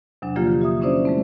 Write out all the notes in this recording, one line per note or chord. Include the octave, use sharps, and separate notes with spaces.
E2 C3 F#3 D4
D3 F3 F#3 A#3 F4 G4
G4 E5 D#6
C#4 D4 E4 C5 D5
G#3 A3 C4